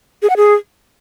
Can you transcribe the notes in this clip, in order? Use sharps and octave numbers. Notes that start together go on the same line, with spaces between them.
G#4
F#5
G#4